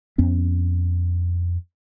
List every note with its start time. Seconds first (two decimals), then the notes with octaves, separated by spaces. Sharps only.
0.18 F2 B3 C#4